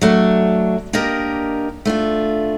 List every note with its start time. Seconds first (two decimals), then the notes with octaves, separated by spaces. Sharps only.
0.01 F#3 A3 D4
0.93 A#3 D4 G4 A#4 D#5
1.85 A3 D4 F4